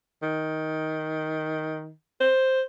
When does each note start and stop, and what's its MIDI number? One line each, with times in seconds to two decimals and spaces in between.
0.22 1.91 51
2.20 2.62 72